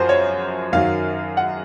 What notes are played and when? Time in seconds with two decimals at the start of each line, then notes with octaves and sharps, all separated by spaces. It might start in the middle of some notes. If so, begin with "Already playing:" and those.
Already playing: F#2 F3 F#4 C5
0.09 C#5
0.73 F#2 D#3 F#3 F5
1.37 F#5